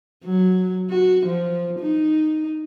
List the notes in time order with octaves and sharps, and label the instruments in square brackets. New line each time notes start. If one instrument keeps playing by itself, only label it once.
[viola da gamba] F#3
F#4
F3
D#4